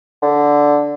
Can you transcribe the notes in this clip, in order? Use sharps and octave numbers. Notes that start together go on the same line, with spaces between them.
D3